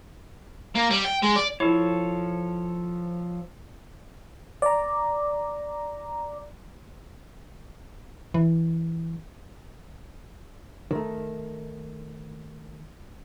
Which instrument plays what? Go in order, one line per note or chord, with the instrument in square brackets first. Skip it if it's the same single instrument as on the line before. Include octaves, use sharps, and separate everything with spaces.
[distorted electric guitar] A#3
G3
G5
G#3
D5
[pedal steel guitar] F3 A4 C#5 [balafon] E4
[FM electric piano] D5 A#5
[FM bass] E3
[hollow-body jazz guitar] D#3 A3